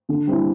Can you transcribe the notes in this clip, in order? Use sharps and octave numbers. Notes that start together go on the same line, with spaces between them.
D3
G3 C4 E4